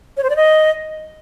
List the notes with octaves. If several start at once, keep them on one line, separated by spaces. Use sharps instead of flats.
C#5
C5
D5
D#5